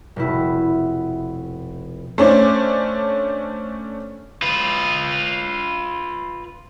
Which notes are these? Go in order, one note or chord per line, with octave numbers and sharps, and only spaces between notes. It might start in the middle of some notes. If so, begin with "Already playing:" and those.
F1 B2 E4
A3 C#4 D4 C5
F4 B4